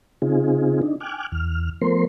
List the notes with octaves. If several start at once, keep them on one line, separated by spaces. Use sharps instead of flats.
C#3 C4 D#4 F4 G#4
D4 D#4
G5 G#5 D6 F6 F#6
E2 F6
F3 A3 B3 A#4 C5 C6